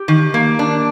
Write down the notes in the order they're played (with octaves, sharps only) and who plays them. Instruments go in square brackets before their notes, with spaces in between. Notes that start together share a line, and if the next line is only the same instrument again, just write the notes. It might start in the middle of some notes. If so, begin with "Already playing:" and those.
Already playing: [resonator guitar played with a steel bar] G4
D#3
A#3
D4